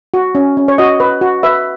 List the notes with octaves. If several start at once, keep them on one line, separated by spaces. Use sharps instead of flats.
F#4
C#4
C#4
C#5
F#4 D#5
B4
F#4
B4 E5